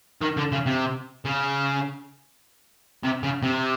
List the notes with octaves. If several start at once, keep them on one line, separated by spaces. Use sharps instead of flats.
D#3
D3
C#3
C3
C#3
C3
C#3
C3